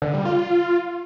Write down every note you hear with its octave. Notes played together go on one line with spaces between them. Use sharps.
D3
G3
F4